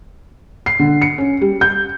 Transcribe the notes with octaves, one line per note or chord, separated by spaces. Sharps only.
C7
D3
C#7
C#4
G3
G6